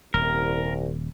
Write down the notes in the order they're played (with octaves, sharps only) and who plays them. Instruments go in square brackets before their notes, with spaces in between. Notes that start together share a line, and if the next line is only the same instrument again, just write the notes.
[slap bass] D#1 [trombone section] C2 [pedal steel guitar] A#4